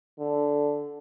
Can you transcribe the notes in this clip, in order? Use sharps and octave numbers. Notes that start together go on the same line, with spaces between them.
D3